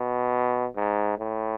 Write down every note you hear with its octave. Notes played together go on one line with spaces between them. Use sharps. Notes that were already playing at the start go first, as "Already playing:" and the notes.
Already playing: B2
G#2
A2